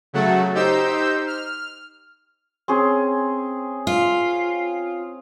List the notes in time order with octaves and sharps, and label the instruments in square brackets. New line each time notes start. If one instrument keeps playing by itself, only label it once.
[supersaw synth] C#3 F#3 A3 F#4 A4
D#4 G4 C5 E6 G6
F6
[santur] C4 C#4 G#4
[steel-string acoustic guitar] F4